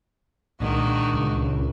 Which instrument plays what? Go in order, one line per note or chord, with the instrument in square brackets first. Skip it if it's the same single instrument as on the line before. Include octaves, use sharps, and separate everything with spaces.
[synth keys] C2 A#2 G#3 [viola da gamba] D#3 D4 F#4
[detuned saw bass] C#2